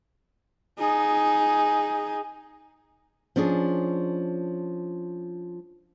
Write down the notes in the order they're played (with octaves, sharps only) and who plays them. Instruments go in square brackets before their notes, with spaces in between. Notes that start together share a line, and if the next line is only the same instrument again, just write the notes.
[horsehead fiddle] D#4 G#4
[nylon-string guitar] F3 C#4 D4 G#4